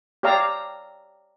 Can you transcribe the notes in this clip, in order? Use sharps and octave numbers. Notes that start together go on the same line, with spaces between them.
G4 C#5 D5 F5 A#5 E6